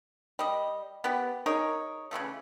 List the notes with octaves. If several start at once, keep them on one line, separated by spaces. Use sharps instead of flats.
G3 D#5
B3 G4
D#4 G#4 A#4 C#5
C#3 E3 F3 A3